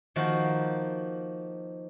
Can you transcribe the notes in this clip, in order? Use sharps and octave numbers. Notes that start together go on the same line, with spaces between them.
D#3 F3 A#3 F#4 A#4